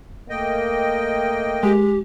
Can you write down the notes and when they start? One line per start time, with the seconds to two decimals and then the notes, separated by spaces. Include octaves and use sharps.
0.30 A3 A#3 D#5 G5
1.63 G#3 G4